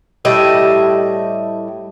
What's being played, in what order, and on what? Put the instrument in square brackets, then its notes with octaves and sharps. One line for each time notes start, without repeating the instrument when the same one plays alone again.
[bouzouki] A2 G3 D#5 E5